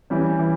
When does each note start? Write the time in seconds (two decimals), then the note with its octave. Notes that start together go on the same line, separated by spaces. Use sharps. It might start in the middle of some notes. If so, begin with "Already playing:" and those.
0.10 E3 G3 C#4
0.39 E3